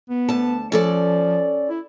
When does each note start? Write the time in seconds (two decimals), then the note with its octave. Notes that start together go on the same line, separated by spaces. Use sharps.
0.10 B3
0.29 D2 A5
0.72 F3 C#4 A4 D5
1.69 E4